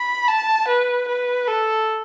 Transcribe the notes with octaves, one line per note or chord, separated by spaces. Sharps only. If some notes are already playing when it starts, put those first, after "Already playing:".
Already playing: B5
A5
B4
B4
A4